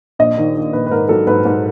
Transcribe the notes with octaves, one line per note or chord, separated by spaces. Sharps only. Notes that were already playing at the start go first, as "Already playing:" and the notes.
A#1 D#5
D#3
D#3
A#1 B4
B4
G#2 A#4
F#3 A4
G#2 B4
G#2